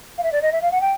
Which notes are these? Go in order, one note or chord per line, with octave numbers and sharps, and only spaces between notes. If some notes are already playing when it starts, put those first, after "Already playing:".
F5
E5
D5
D#5
E5
F5
F#5
G5